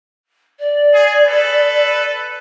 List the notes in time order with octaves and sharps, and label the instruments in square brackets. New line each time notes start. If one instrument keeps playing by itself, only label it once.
[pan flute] D5
[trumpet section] G#4
A4 B4